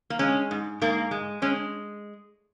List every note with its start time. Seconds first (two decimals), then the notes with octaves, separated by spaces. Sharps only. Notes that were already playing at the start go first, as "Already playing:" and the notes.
0.10 A#3
0.19 G#3 C#4
0.51 G#2
0.81 G#2 A#3
1.11 G#3
1.42 G#3 C#4